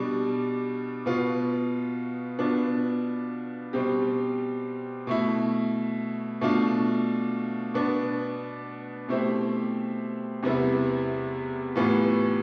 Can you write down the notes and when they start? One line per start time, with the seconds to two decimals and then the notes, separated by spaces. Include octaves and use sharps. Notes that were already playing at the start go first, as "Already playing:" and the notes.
Already playing: B2 G3 D4
1.06 B2 B3 F4
2.39 B2 B3 D4 F4
3.73 B2 G3 C4 G4
5.07 B2 A3 E4
6.41 B2 A3 D4 F4
7.74 B2 B3 D4
9.08 B2 A3 C4 E4 G4
10.43 E2 C3 G3 B3 E4
11.76 A2 E3 G3 B3 F4